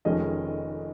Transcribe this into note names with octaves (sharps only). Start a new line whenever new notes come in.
F1 F2 D#3 G#3 C#4 D#5